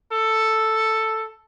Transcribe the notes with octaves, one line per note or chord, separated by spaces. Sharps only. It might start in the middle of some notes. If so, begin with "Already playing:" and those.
A4